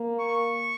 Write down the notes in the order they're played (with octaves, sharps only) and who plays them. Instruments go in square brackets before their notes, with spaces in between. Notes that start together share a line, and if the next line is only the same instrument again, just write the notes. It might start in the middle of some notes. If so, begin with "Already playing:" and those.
Already playing: [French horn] A#3
[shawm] C#6